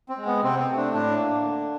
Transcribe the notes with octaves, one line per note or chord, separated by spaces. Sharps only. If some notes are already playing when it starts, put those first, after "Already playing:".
C4
G#3
B3
C3 C4
C4
A3
D4
A2 D4
A#3
D3